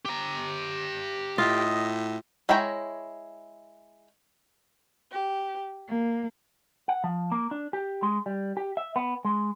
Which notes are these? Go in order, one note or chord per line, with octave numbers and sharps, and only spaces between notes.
G4 A#5
A2 F4 D#5
G#3 E4 C#5 G5 A#5
G4
A#3
F#5
F3
A#3
D4
G4
G#3
G3
G4
E5
B3
G#3